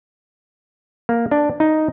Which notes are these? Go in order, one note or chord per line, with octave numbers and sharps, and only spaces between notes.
A#3
D4
D#4